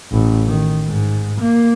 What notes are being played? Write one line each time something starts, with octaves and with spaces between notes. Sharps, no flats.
A1
D#3
G#2
A#3